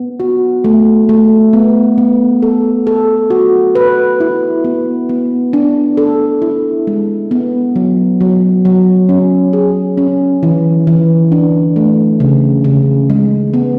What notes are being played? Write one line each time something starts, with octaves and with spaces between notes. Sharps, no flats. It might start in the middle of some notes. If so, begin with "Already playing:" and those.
Already playing: B3
F#4
A3
A3
B3
B3
A4
A4
F#4
B4
E4
B3
B3
D4
A4
E4
G#3
B3
F#3
F#3
F#3
C#4
G#4
C#4
E3
E3
D4
A3
C#3
C#3
G#3
B3